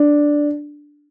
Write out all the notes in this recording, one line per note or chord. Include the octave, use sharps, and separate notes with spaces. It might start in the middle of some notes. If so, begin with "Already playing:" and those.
Already playing: D4